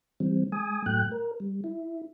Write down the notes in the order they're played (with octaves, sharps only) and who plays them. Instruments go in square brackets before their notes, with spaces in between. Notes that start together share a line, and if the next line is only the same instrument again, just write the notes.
[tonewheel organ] E3 G3 C4
G#3 G#5 D#6
A2 F#3 A3 G5 F#6
A#4
G3
E4